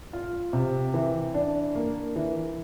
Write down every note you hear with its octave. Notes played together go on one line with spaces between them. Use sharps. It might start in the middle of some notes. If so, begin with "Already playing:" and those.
F4
C3
E3
D4
A#3
E3